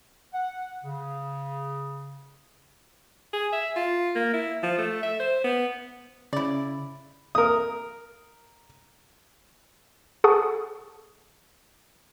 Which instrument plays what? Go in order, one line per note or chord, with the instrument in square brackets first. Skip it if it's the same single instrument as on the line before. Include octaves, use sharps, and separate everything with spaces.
[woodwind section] F#5
C#3
[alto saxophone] G#4
E5
F4
A#3
E4
F3
A3
E5
C5
B3
[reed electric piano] C#3 [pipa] E4 D5
[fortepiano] A#4 D#6
[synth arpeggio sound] G#4 A4 F#5 A5 C#6 D#6